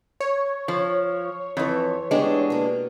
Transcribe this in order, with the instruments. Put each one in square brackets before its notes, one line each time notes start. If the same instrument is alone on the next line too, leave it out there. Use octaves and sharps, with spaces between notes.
[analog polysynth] C#5
[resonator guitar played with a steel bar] F3
[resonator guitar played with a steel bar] F2 [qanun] E3 A4
[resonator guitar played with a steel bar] G#3 D4 [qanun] A3 B3 G4
[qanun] B2 A#3